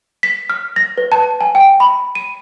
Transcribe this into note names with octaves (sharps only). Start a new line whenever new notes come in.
B6
F6
A#6
B4
A5
G#5
G5
B5
D#7